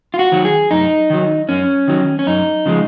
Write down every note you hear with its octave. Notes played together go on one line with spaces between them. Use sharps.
F4
F#4
D#3 F#3
G#4
F#2 D#4
D#3 F#3
F#2 C#4
D#3 F#3
C#4
F#2 D#4
C#3 F3 G#3